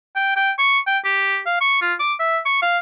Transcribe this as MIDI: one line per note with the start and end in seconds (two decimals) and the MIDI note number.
0.16 0.34 79
0.37 0.52 79
0.58 0.80 85
0.87 0.98 79
1.05 1.40 67
1.46 1.59 77
1.61 1.81 85
1.82 1.94 65
2.00 2.14 86
2.20 2.39 76
2.45 2.60 85
2.62 2.79 77